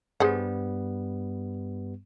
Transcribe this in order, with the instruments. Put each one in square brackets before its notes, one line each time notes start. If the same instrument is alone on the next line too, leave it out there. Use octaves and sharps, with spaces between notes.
[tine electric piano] G2 G3 B3 [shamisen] G#4 C5 F#5